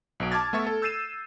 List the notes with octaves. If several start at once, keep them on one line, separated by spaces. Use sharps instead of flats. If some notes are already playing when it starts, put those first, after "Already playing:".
B1 B2 D7
A5 D6 F6 G#6 A6
A3 B3 E5 C#6 A6
A4
E6 G6 A6 C7 D#7 E7